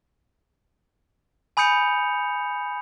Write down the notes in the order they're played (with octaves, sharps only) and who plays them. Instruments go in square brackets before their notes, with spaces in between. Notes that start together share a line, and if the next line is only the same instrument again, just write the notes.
[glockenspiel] G#5 B5 D#6 G6 C#7 F7